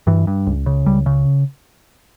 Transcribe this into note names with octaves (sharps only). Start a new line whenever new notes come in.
G2 E3
G2
C#2
C#3
C#2 G3
C#3